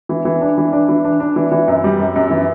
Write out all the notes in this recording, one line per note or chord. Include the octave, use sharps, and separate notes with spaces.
E3
E3
D4
E3
D4
E3
D4
D4
E3
E3
F#2
G3
F#2
F#2
E3